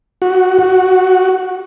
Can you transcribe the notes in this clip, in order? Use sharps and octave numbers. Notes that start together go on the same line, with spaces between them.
F#4
F#4